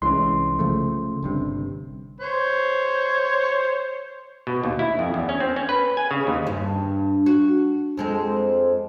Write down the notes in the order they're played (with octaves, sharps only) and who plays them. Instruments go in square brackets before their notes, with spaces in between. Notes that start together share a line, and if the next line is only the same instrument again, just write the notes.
[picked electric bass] C2 E3 G#3 [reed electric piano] C#4 C6
[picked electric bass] C#3 F3 A3
G1 G2 C3
[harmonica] C5 C#5
[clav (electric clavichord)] B2
D#2
E4
F2
E2
C#4
C4
C#4
B4
G#5
C#3
D#2
[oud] G2
F#4
F2 G#3 C4